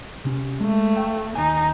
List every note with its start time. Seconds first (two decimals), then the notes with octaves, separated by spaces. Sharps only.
0.25 C3 C#4
0.60 G#3 A3
0.95 F5 G5
1.35 D#2 B2 D#4 G#5